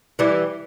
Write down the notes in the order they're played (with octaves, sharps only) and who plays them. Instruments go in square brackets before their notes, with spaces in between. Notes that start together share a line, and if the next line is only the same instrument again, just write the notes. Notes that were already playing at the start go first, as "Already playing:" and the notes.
[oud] E3 G3